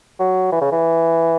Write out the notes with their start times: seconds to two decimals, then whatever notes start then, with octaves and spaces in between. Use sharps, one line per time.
0.19 F#3
0.52 E3
0.61 C#3
0.72 E3